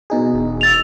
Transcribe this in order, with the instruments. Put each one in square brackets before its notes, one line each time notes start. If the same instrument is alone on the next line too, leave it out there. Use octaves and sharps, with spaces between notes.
[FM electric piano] B2 D#4 G#4
[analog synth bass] E1
[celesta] E6 A6 F7